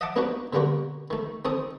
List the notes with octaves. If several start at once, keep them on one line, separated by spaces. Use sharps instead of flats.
D#5 E5 F#5 A5 D6
A#3 B3 D4 D#4 F#4 B4
B2 D3 G3 A#3 F#4
D#3 A3
D#3 C4 A4 D#6